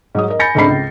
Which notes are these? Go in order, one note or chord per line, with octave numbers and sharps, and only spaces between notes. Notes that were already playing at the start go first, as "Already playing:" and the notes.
G#2 F#3 D#6
A#4 D#5
G#5 B5 G6 A6 A#6 C#7
D2 G#2 C4 D4 B5 C7
C#2